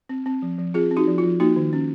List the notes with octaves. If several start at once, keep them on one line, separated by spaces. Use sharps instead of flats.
C4
C4
F3
F3
C4 F4 G#4
C4
D#4 F#4
F3
F4
F3
A#3 D#4 F#4
D#3
C#4